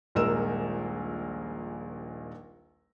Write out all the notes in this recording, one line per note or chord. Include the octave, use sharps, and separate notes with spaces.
D#1 A#1 G#3 A#4 E6 E7